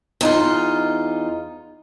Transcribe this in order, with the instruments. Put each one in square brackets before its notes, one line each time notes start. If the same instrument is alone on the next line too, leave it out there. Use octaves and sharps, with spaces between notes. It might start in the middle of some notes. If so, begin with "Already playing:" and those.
[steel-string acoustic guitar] E2 D#4 F4